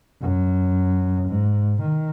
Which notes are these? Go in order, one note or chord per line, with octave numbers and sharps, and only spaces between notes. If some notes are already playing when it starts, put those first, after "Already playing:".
F#2
G#2
D#3